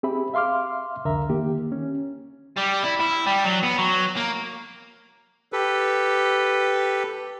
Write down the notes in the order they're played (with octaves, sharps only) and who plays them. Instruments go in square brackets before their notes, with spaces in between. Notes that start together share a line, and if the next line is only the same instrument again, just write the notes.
[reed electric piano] C4 G4 G#4 E5 B5
E5 F5 C6 D6 F6
C2 F2 D3 A#4 E5 A#5
D#3 A#3 G4
C#4
[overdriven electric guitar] G3
E4
E4
G3
F#3
B3
F#3
A#3
[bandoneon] G4 A4 B4